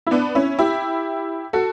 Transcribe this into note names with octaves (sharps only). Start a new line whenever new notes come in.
E4
B3 D4
C#4 E4
E4 G4
F#4 A4